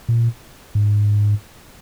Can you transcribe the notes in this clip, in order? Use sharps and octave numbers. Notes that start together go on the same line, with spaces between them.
A#2
G#2